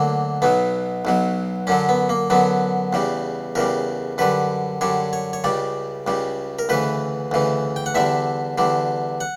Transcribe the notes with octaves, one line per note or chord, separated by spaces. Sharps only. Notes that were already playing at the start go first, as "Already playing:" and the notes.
Already playing: D2 D3 F#3 A#3
B1 B2 F#3 B3
B1 B2 F#3
F#2 D3 F#3 C#4
B3
A#3
F#2 D3 F#3 B3
E2 C#3 G3
E2 C#3 G3 A#4
F#2 D3 G3 B4
F#2 D3 G3 C#5
C#5
C#5
C#2 C#3 G3 D5
C#2 C#3 G3
A#4
D2 C#3 E3 B4
D2 C#3 E3
G5
F#5
E2 D3 G3 E5
E2 D3 G3
F#5